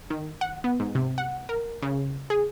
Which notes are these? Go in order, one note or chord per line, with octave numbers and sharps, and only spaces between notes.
D#3
F#5
B3
G#2
C3
F#5
A#4
C#3
G#4